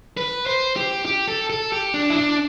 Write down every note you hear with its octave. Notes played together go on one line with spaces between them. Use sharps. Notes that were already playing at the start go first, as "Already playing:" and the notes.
B4
C5
G4
G4
A4
A4
G4
D4
E4
D4